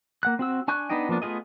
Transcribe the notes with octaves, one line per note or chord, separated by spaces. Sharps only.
A#3 F#5 F#6
C4 F#4 E6
D4 G#5 C#6 F#6 G6
B3 D4 D#4 D#5 G5
F3 A#3 B3 D4 F4
A3 B3 F4 G#4 D#5